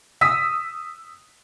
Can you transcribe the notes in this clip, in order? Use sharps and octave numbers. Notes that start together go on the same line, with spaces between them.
D#6 E6 B6